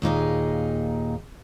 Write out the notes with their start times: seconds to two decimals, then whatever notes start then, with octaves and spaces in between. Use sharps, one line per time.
0.02 D#2 A#2 D#4 G#4